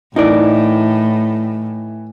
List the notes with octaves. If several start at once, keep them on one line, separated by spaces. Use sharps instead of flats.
A2 E3 D#4 A#4 D5